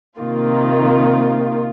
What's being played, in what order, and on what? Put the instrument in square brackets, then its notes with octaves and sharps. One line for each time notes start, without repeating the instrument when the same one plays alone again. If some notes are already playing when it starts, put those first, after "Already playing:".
[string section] C3 D#3 A#3 F4